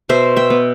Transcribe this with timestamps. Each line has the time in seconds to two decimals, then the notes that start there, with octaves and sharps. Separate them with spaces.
0.09 B2 C5 E5
0.36 E5 G5
0.50 B3